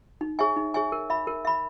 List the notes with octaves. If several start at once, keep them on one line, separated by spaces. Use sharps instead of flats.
D#4
G#4 C#5 E5 G#5
D#4
G#4 C#5 E5 G#5
A#4
E5 B5
A#4
E5 B5